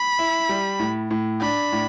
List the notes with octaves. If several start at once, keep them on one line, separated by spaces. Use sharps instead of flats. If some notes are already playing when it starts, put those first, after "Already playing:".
Already playing: B5
E4
G3
A2
A2
D4 B5
A2